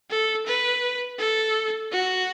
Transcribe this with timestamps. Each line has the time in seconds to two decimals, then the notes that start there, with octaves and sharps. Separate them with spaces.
0.10 A4
0.47 B4
1.19 A4
1.92 F#4